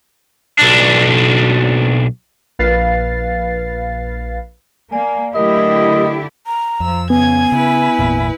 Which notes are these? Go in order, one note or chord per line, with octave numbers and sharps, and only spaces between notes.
B1 D4
A#1 B4 F5 A6 C7
A#3 D5 G#5
D3 F#3 A3 E4 G4 A#4 D#5
A#5
F2 F3 E6
C#3 B3 G#5 G#6
C#3 E4 B4
G#1 E2 A#2